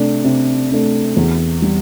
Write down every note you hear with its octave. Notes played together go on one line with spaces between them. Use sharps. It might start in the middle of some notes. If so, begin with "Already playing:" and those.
Already playing: C3 A3 D4
C3
A3 D4
E2
G3